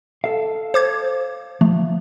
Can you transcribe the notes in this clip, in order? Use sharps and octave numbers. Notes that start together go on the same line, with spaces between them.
A4 F5
C5 D6 G#6
F3 A3